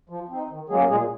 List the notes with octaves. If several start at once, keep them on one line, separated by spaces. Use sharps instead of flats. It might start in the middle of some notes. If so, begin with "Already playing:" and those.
F3
C4 D#4
D#3
F#3 G#3 A#3 C#4 G#4
A#2 G#3 G#4